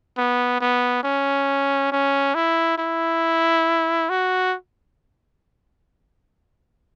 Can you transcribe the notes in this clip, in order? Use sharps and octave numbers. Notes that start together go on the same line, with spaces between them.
B3
B3
C#4
C#4
E4
E4
F#4